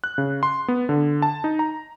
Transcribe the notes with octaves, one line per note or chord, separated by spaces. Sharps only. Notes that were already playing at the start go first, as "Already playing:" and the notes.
F#6
C#3
C6
B3
D3
A5
D#4
A#5